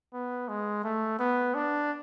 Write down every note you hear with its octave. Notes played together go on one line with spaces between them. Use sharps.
B3
G#3
A3
B3
D4